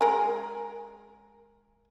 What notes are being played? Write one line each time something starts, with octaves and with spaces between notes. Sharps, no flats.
G#3 A#4 G#5